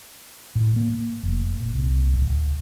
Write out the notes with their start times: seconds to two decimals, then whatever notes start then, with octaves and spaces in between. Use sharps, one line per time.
0.55 A2
0.76 A#3
1.23 F1
1.60 A#2
1.74 C2
2.13 D1